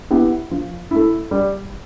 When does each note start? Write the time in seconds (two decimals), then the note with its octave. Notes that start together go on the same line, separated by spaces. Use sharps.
0.10 B3 E4 G4
0.51 F3
0.91 A3 E4
1.31 G3